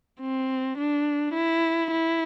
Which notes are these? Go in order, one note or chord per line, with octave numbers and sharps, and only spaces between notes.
C4
D4
E4
E4